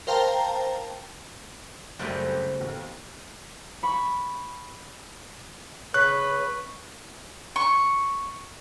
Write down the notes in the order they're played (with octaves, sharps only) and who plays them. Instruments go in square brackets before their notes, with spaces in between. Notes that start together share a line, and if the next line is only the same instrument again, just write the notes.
[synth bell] A#4 C5 F5 G5 A5 A#5
[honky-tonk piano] F#1 G3 G4 [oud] C#3 A3 C4
[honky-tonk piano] D#2 B2
[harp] B5 C#6
[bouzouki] C#3 [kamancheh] B4 [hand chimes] C#6 B6 [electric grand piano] F#6
[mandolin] C#6